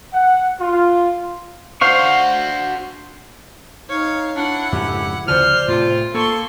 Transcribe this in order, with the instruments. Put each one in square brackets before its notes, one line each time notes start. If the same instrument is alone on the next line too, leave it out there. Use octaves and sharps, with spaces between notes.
[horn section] F#5
F4
[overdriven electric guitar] D4 F#4 [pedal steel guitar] C5 F5 C#6
[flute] D#4 [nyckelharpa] C#5 F5
[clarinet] D4 [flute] E4 [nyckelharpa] F#5
[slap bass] F2 G#2 C#3 [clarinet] G4
[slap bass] D2 C#3 F3 [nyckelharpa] C5 [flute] D5 [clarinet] F6
[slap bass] A2 C3 [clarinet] F4
[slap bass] A#3 [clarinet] A4 [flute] A5 [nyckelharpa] C6 C#6